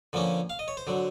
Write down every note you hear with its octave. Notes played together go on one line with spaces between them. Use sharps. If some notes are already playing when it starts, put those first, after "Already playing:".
D3 F3 A#3 C#4
F5
D#5
C#5
C5
D3 F#3